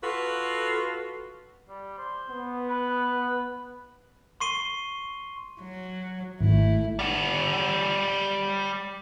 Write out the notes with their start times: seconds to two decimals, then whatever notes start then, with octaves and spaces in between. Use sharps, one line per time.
0.03 F4 F#4 A4 B4
1.69 G3
1.98 C5
2.30 B3
2.69 B4
4.40 C6 C#6 C7 D#7 G7
5.61 F#3
6.41 G#1 A3 E4
6.99 G3 F#5